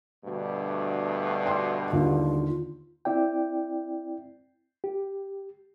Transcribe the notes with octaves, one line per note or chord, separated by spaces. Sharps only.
D2 G2 B2
G5 C6
D#2 D3 F4
C4 E4 D5 G5
G4